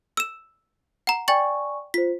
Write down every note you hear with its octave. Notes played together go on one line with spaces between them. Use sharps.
E6 E7
F#5 A#5
D5 G5 G#5 C#6 A6 F#7
F4 C5 B6